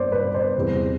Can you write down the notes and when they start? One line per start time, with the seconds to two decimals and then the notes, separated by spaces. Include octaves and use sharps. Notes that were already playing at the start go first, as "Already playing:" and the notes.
Already playing: G2 C5 D5
0.12 B4
0.34 C5
0.56 E2 C3 G3